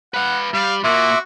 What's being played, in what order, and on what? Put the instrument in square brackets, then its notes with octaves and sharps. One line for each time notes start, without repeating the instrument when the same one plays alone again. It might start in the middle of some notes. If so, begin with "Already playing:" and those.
[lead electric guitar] B4 F5 [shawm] F#5
[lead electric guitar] G3 [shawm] F5
[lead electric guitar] A#2 A#3 [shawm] F#4 [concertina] E5 C6 D6